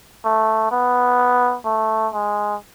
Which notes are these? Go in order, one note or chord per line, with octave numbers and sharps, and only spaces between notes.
A3
B3
A3
G#3